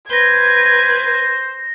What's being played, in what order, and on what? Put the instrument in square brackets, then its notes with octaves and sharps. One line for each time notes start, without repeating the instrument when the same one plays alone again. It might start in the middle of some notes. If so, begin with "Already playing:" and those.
[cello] B4 [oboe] C5 [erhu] G#6 [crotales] A#6 G7